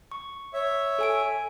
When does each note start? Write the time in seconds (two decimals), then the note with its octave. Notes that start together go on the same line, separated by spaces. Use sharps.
0.11 C#6
0.54 C#5 E5
0.99 A4 G#5 D7